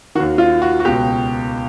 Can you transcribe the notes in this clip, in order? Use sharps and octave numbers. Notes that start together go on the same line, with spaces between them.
D#2 D#3 F#4
F4
F#4
F#4
C#2 B2 G4